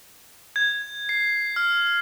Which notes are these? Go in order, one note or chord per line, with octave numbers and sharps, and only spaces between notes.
G#6
C7
F6